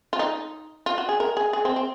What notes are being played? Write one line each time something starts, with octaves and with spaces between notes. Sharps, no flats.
F4
D#4
F4
F#4
G#4
A#4
G#4
G#4
C4
C4